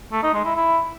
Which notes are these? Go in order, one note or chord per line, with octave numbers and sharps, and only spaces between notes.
A3
D#4
G#3
E4
E4